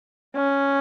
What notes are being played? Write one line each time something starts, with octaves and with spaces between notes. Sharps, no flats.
C#4